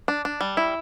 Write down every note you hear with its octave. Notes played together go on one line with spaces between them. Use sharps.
D4
D4
G3
E4